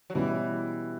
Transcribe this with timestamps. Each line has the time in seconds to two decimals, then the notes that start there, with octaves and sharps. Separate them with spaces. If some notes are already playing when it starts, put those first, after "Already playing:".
0.10 F#3
0.15 B2 E3 G3 C#4 E4 G4